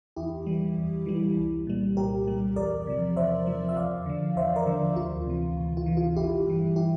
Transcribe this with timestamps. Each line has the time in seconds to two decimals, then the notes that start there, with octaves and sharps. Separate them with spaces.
0.16 E2 E4 G4
0.46 E3 G3
0.77 E2
1.06 E3 G3
1.37 C2
1.67 A#2 G3
1.97 C2 G4 A#4
2.27 A#2 G3
2.56 E2 A#4 D5
2.87 C3 F3
3.16 E2 C5 E5
3.47 C3 F3
3.69 E5
3.76 E2 D5 F5
4.06 D3 F3
4.36 E2 C5 E5
4.56 A#4 D5
4.66 D3 F3
4.96 D2 F4
5.26 C3 E3
5.57 D2
5.77 F4
5.86 C3 E3
5.97 F4
6.16 G1 E4 G4
6.47 G2 E3
6.76 E4 G4